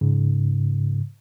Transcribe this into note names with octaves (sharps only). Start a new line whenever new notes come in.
G#2 C#3